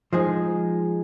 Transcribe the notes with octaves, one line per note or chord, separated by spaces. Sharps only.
F3 G#3 D#4 G#4